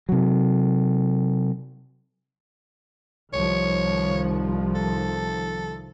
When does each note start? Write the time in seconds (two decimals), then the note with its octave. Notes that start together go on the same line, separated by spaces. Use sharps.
0.09 C3 F#3
3.33 C2 D#3 F3 C#5
4.75 A4